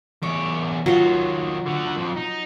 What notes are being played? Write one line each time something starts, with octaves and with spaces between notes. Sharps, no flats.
E2 C#5 D6
D#3 F#3 F4 C#5
D3 F#4
F2 F3
D#4